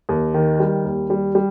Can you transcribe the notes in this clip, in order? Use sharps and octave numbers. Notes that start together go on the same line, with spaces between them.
D#2
D#3
G3
D#2
G3
G3